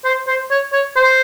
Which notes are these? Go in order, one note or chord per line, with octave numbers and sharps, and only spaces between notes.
C5
C5
C#5
C#5
C5